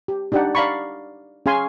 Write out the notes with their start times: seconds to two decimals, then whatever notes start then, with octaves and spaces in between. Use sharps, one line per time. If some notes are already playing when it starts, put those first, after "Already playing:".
0.08 G4
0.32 D4 D#4 G4 D5 F#5
0.55 D5 F5 A#5 B5 C#6
1.46 C#4 G#4 F5 G#5 C6